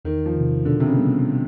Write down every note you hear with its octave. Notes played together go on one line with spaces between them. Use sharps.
E2 D#3
F3
C3 D#3
B2 D3
C3
C#3
G3 B3